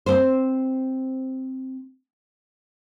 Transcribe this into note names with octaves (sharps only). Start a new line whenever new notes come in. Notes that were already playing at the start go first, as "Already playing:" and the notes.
C4 C5